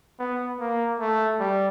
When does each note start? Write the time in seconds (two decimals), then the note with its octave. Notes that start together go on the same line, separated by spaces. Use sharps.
0.19 B3
0.60 A#3
1.00 A3
1.40 G3